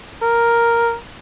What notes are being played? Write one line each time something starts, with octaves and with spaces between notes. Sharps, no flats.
A#4